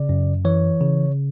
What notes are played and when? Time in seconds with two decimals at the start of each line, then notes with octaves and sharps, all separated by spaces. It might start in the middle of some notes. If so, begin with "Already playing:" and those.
Already playing: C#3 D5
0.09 F#2
0.45 E3 C#5
0.81 C#3